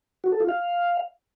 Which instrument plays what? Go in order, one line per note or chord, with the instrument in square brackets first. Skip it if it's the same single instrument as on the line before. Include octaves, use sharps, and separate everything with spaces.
[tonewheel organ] F#4
A4
F4
F5